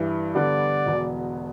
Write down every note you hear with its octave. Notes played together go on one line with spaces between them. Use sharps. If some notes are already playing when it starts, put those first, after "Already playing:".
Already playing: G2 E3 G3 E4
D3 G3 B3 D5
E1 E2 B2